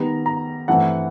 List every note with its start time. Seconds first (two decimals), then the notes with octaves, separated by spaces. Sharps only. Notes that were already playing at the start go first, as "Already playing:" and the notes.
Already playing: D#3 G3 B3 A#5
0.26 A#5
0.68 G2 E3 A3 C4 F#5